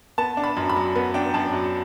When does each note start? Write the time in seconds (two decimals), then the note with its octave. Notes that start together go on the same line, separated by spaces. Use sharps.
0.18 B3 A5
0.37 D4
0.44 B5
0.57 F#2
0.70 B5
0.76 F#3
0.95 B3
1.14 D4 G5
1.34 F#2 A5
1.53 F#3